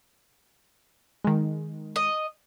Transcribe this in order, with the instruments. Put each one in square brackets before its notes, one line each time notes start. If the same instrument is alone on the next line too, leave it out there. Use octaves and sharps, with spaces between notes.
[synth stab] D#3 G#3
[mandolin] D#5